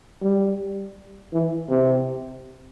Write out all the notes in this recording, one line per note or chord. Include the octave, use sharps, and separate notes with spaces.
G3
E3
C3